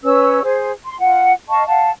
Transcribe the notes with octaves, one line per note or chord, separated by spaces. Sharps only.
C#4 B4 E6
G#4 C5
C6
F4 F#5
D#5 F5 A5 C#6
F5 F#5 A5